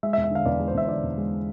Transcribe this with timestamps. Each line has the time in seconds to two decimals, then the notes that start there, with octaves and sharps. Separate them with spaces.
0.03 G#3 E5
0.13 E5
0.17 E2
0.24 E5
0.31 D3 F5
0.46 E2 D5
0.60 G#3
0.68 C5
0.74 E2 E5
0.85 C5
0.89 D3 D5
1.03 E2
1.18 G#3